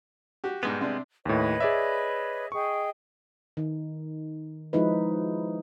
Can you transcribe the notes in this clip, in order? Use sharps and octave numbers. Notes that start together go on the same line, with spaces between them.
F#4 G4
G#2 B2 G3 G#3 B3
C3 C4 D4
D#2 A2 B4 C#5 D#5
G#4 D5 E5
G#4 D#5 G5 C#6
D#3 D#4
F3 G#3 D#4 E4 B4